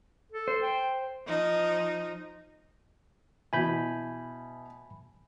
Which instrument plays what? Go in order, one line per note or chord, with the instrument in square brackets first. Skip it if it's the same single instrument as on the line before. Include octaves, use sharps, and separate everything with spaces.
[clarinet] A4
[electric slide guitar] C5
[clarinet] G5
[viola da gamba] F3 D#4
[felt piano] B2 E3 [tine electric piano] G#5 B5 G6